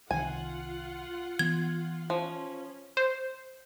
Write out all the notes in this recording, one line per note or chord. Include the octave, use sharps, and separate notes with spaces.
C2 C3 D#3 F4 F#5 G#5
E3 B3 G#6
F3 C#4
C5